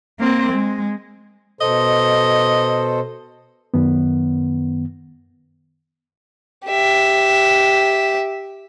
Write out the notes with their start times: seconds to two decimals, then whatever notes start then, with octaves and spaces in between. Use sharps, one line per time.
0.20 A#3 C4
0.53 G#3
1.61 B2 A4 C5 D#5
3.74 F#2 D#3 B3
6.66 G4 E5